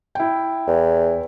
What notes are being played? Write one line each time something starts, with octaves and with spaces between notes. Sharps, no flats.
E4 G5
E2